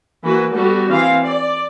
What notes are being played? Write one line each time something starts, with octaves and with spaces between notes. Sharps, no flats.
E3 A#3 F#4 B4
G3 B3 F#4 A4
E3 C4 F5
D5